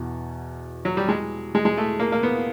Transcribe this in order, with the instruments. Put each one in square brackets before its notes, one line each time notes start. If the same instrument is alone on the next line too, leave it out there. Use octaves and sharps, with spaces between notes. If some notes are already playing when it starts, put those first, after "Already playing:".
Already playing: [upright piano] E2 B2
[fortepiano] F#3
G3
G#3
G#3
G#3
A3
A#3
A#3
B3